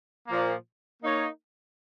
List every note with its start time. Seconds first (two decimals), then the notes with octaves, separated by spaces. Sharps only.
0.27 A#2 F3 A#3
1.02 A#3 D#4 C#5